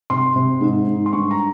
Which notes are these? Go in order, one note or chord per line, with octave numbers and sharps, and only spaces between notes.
C3 C6
C3
G#2
G#2
C6
G2 C#6
A#5